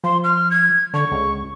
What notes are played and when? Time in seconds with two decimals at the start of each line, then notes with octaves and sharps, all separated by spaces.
0.04 F3 C6
0.24 F6
0.50 G#6
0.94 D3 C#6
1.12 C#2